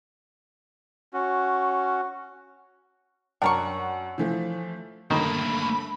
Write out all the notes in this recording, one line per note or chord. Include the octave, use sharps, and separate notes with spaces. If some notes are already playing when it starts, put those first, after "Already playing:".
C#4 F#4
F#2 D4 A#4 F#5 C#6
E3 F3 A3
G1 D#3 A3 A#3 B5